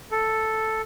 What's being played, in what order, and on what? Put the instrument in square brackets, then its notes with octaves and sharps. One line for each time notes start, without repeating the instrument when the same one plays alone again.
[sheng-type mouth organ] A4